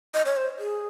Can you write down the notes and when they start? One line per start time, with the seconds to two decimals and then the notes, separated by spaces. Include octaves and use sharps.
0.14 D#5
0.25 C#5
0.36 C5
0.59 G#4